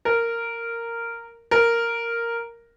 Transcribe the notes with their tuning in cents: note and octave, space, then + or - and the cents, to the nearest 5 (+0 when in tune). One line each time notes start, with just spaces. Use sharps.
A#4 -10
A#4 -5